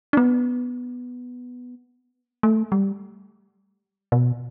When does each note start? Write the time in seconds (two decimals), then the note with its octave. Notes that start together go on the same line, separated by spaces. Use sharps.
0.13 D4
0.17 B3
2.43 A3
2.72 G3
4.12 B2